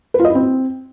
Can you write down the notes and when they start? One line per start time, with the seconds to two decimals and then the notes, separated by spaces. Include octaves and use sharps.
0.14 B4
0.19 F4
0.25 D#5
0.30 E4
0.35 C4